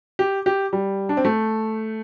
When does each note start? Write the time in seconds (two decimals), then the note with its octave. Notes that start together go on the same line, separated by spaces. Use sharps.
0.19 G4
0.46 G4
0.73 G3
1.09 D4
1.17 C4
1.25 A3